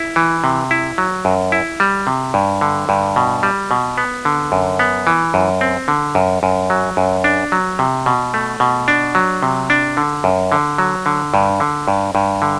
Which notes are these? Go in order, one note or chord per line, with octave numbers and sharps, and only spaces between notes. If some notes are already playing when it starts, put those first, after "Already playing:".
Already playing: E4
E3
C3
E4
F#3
F#2
E4
G3
C3
G2
D3
G2
B2
G3
B2
B3
D3
F#2
B3
E3
F#2
C4
D3
F#2
F#2
F#3
F#2
D4
F#3
C3
B2
A3
B2
D4
F#3
C3
D4
D3
F#2
D3
F#3
D3
G2
D3
G2
G2
D3